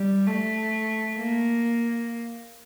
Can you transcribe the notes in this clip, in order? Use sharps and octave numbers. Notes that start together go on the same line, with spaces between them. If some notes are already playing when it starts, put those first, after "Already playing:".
Already playing: G3
A3
A#3